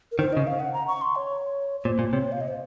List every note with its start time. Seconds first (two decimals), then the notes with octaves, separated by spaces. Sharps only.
0.12 A#4
0.19 D#3 C5
0.33 C#3 D#5
0.47 F5
0.60 F#5
0.74 A#5
0.87 C#6
1.01 C6
1.16 C#5
1.80 C#5
1.85 A#2 C5
1.99 A#2
2.13 C3 C#5
2.32 F5
2.41 D#5
2.48 C5